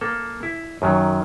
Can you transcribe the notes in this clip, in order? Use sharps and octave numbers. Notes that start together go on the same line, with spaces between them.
A#3 A4
E4
F#2 D#3 F#3